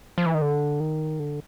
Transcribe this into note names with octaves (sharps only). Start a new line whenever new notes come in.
F3
E3
D#3
D3
D#3
D3